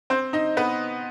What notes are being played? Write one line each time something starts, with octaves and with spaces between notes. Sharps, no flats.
C4 C5
D#4 D#5
B3 B4